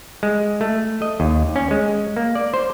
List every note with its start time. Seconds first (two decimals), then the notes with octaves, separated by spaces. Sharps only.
0.23 G#3
0.61 A3
1.02 D#5
1.20 D#2
1.56 C#4
1.71 G#3
2.17 A#3
2.35 D5
2.54 C5